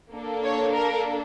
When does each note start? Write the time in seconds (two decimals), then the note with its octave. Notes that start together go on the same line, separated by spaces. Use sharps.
0.12 A#3 D4 A4
0.44 C#5
0.74 A#4